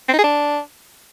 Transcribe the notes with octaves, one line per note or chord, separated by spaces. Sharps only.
C4
D#4
G#4
D4